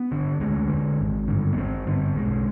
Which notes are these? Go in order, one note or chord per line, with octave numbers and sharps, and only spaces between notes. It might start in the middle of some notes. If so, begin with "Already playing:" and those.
Already playing: B3
D3
D2 G#3
D3
G#1
G2 D3
B3
G#1 C4
G2 D3 B3
B1 G#3